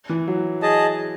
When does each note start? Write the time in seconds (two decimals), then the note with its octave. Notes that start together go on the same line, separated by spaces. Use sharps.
0.09 E3
0.28 F#3
0.62 G#4 D#5 A5